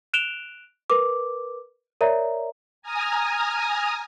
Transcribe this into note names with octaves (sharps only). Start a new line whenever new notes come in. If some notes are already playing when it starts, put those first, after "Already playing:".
F#6 D7 E7 F7 G7
A#4 B4 D6
A#4 C#5 D5 E5 A#5
G#5 A#5 D#6 F6